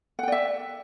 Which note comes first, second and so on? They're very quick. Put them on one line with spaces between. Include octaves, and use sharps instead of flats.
F#5 G5 D5 E5